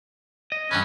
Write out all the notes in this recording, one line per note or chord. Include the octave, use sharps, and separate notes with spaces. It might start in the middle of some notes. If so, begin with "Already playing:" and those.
D#5
G2 E3 C#4 B4